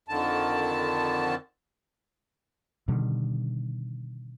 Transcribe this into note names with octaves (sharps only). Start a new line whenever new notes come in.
F2 D3 D#3 A5
B2 D3 D#3 G3